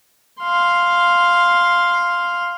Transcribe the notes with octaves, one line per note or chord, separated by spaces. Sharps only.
F5 C6